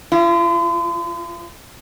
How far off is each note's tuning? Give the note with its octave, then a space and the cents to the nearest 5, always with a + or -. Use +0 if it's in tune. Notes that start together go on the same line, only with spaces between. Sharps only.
F3 +0 F4 -45